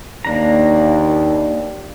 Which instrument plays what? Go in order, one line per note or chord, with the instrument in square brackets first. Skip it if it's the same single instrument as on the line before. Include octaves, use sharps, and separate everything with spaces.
[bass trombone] D#2 [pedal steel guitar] A#3 D4 A#5